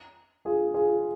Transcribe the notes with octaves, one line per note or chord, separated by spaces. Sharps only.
F4 G#4
F4 G#4